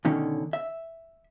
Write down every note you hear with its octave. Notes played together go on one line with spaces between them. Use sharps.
B2 D3 D#3 C#4
E5